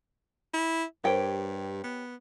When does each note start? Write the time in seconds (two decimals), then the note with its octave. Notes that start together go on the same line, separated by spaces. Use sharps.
0.54 E4
1.04 G2 G4 A#4 C5 C#5 G5
1.84 B3